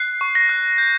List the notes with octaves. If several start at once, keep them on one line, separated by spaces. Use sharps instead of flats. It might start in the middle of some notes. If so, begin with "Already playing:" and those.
Already playing: F#6 C7
C#6
A#6
F#6
G6